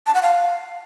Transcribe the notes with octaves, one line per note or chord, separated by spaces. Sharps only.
A5
F#5
F5